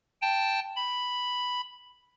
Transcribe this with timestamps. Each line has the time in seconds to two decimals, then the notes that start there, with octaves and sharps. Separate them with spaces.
0.22 G5 A5
0.76 B5